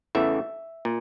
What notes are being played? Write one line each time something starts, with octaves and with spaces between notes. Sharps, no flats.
E2 C#3 E3 A3 E5
A#2